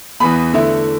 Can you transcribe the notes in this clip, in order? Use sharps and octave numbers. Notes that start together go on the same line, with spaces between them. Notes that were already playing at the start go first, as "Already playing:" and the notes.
E2 E3 B3 B5
D3 A3 E4